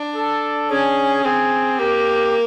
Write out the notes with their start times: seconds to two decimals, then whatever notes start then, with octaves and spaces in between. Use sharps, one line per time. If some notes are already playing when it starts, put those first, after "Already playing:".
Already playing: D4
0.16 A4
0.70 C#4 G#4
1.24 C4 G#4
1.79 A#3 G4